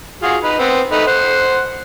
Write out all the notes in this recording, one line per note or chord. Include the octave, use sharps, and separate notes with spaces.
F4 F#4 G#4
D#4 B4
B3 C4
A3 D#4 B4
C5 F#5